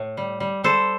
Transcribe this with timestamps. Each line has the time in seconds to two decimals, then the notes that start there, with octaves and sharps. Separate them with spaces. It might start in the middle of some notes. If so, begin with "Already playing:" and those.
Already playing: A2
0.17 G3
0.40 G3
0.64 G3 A4 C5